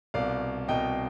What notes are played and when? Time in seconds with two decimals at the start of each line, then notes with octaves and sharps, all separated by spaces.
0.14 C2 B2 D5 F5
0.68 C2 B2 D#5 G5